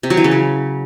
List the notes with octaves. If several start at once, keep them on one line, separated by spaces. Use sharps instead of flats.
C3
F#3
E3
C#3
F#3